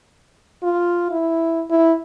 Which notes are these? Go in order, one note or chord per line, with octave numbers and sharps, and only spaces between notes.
F4
E4
E4